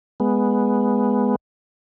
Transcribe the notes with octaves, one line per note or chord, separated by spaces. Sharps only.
G#3 B3